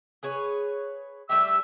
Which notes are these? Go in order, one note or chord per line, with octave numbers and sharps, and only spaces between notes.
G#4 B4 C#5
G3 A3 G4 E5 E6